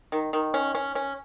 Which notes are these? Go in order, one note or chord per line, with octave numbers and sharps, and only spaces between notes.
D#3
D#3
C#4
C#4
C#4